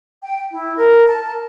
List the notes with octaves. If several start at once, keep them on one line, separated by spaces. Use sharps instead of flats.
G5
E4
A#4
A5